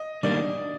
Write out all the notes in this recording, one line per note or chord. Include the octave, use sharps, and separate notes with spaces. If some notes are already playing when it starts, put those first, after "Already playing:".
Already playing: D#5
D#3 G3 A#3 D4 D5